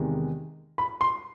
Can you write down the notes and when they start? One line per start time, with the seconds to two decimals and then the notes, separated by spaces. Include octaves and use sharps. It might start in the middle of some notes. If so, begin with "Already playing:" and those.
Already playing: E2 C3 D#3 G#3
0.78 B5
1.01 C6